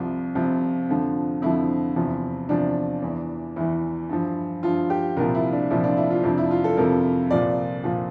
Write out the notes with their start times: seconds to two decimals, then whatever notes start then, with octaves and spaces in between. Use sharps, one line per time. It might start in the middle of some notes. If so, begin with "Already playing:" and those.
Already playing: C2 C3 F3
0.35 C2 C3 F3
0.89 F2 D3 F3
1.42 F2 D3 F3 E4
1.96 E2 C3 F3
2.49 E2 C3 F3 D4
3.02 E2 E3
3.56 E2 E3 E4
4.09 G2 F3
4.63 G2 F3 F4
4.90 G4
5.17 C2 A#2 F3 A#4
5.35 E4
5.52 D4
5.70 C2 A#2 F3 E4
5.84 D4
5.97 E4
6.10 F4
6.23 F2 C3 F3 D4
6.38 E4
6.51 F4
6.64 A4
6.77 F2 C3 F3 A#4
7.30 C2 A#2 F3 D5
7.84 A#2 F3